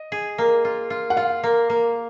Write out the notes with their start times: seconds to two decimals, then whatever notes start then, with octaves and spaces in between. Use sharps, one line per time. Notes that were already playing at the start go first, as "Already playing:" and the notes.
Already playing: D#5
0.12 G#4
0.38 A#3
0.65 F4
0.90 F4
1.10 F#5
1.17 F4 F5
1.43 A#3
1.70 A#3